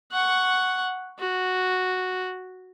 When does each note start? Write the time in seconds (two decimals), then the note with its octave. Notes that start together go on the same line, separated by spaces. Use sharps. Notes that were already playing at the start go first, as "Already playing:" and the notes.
0.12 F#5 C#6
1.19 F#4